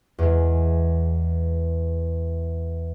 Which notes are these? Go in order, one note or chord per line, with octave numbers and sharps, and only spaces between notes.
E2 G#3